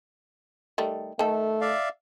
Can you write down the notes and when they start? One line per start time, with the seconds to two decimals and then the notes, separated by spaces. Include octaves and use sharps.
0.78 D#3 G3 A3
1.19 D#3 A3 A4
1.61 D5 E5 F5